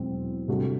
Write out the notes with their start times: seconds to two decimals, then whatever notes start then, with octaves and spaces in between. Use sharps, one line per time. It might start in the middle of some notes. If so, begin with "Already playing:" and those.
Already playing: E1 E2 B2 F#3 C4
0.48 C3 G3 D4 F#4 A4